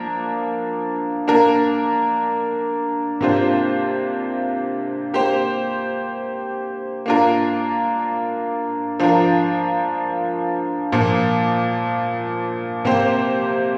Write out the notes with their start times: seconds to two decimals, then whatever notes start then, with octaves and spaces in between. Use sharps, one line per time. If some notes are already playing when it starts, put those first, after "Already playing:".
Already playing: F3 A#3 D4 A#4
1.28 A#3 D4 A#4
3.21 C3 A#3 D4 F4 C5
5.14 A#3 G4 C5
7.06 A#3 D4 F4 A#4
9.00 F3 D4 F4 A#4
10.92 A#2 F3 A#3
12.85 C3 A#3 G4 C5